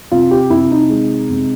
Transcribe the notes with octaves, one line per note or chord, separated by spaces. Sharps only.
C3 F4
G4
C3 E4
D#4
G#3
C3